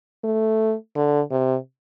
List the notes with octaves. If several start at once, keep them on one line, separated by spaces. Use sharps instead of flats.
A3
D3
C3